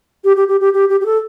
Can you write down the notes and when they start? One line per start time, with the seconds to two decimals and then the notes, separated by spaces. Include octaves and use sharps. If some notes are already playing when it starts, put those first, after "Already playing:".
0.24 G4
0.37 G4
0.48 G4
0.61 G4
0.73 G4
0.89 G4
1.01 G4
1.06 A4